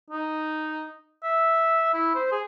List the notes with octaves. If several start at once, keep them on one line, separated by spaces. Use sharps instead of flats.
D#4
E5
E4
C5
G#4